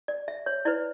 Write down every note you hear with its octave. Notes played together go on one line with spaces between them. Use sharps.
D5
E5
C#5
E4 B4 D5